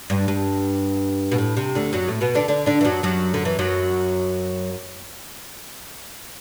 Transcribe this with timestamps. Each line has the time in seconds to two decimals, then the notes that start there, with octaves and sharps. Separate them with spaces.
0.10 G2
0.28 G2
1.32 B2
1.38 A2
1.57 C3
1.75 D2 D3
1.93 F#2 F#3
2.08 A2 A3
2.21 B2 B3
2.35 D3 D4
2.48 D3 D4
2.66 D3 D4
2.81 E3
2.85 F#2 F#3
3.03 F#2 F#3
3.34 D3
3.45 E3
3.59 F#2 F#3